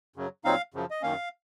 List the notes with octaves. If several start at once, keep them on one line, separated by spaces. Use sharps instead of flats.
F#2 C#3 F#3
A#2 F#3 C4 D#4 F5
F#2 C#3 F3
D#5
F#2 D#3 A#3 C#4 F5